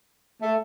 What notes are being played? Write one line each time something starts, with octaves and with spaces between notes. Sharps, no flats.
A3